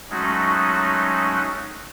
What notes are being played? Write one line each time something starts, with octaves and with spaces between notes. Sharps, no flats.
F#3 G#3 A3 C#4 D#4 F#4